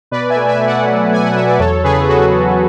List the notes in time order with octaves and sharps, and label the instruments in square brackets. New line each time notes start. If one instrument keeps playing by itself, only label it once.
[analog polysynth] B2 B4 D5
E5 G#5
A3
E5 G#5
A3
D5 F#5
F#3
A3 G#5
F#5
F#3 E5
D5
E2 A4 C#5
C#3 G#4 B4
G#4
F#3 F#4 A4
F#3